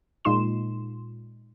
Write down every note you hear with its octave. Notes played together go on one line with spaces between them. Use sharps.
A#2 G#3 D#4 F4 C6 E7